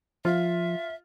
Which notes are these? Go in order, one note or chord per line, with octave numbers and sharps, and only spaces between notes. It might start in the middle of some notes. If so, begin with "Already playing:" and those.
F3 F4 E5